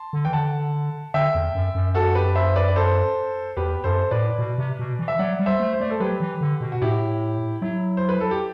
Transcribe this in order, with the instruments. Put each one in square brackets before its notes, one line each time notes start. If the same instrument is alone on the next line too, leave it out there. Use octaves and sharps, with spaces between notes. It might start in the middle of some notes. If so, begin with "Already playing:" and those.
Already playing: [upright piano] A5 C6
[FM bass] D3
[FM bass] E3 [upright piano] G5
[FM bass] D3 [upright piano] F#5 A5
[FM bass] D3 [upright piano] E5 G5
[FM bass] E2
F#2
F#2
[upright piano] F#4 A4
G4 B4
C5 E5
B4 D5
D5
A4 C5
[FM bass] E2 [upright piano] G4 B4
[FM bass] F#2 [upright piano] A4 C5
[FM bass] A2 [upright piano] B4 D5
[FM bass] B2
C3
B2
E3
[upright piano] E5
[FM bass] F#3 [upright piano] D5 F#5
[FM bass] G3
[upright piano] C5 E5
[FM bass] A3
[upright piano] C5
[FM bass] A3 [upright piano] D5
[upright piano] A4 C5
[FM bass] F#3 [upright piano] G4 B4
[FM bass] E3
D3
B2
[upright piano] F#4
[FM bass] A2 [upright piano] E4 G4
[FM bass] F#3 [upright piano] E4
[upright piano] C5
B4
A4
G4